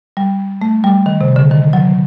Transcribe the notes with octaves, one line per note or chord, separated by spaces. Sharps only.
G3
A3
G3
D#3
C3
D3
D#3
F#3